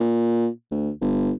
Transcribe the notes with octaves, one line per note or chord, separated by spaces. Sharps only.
A#2
D2
G1